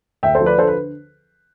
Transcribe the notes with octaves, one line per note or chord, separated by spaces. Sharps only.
D2 E5 G5
A4 C5
F3
B4 D5
D3 A4 C5
B4